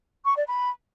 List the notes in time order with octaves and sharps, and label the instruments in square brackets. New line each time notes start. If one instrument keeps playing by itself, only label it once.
[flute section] C#6
D5
B5